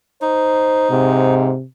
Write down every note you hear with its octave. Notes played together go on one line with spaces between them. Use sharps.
D#4 C5
G#2 C3